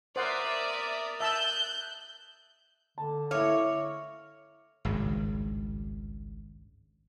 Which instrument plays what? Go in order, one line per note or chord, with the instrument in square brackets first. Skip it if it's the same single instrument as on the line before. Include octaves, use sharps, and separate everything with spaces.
[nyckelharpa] A#4 D#6 [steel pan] C5 F#5 C6 [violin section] D5 E5
[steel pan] E5 A5 E6 [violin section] F#6 G6
[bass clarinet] D3 [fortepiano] A5
[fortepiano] E4 F5 [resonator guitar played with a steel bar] C#5 [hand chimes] E5 D6 F6
[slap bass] G#1 C#2 G2